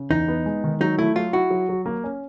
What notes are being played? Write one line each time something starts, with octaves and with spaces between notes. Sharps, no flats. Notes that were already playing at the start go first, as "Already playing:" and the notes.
Already playing: C#3
E2 D#4
B3
G#3
D#3
F#3 D#4
A3 E4
F#3 F4
E4 F#4
F#3
F#3
A#3
C#4